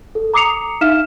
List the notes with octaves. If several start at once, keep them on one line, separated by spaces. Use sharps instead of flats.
A4
A#5 D6 D#6 C7 C#7 F7
D#4 E5 F5 F6 B6 E7